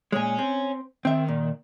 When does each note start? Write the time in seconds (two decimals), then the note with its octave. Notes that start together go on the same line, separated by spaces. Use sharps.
0.12 A#2 G#3 C#5 G#5
0.39 C4
1.05 D#3 C4 E5
1.28 A#2